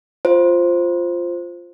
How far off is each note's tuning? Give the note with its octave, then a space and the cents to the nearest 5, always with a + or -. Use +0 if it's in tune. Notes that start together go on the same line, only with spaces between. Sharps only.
F4 +0 C5 +5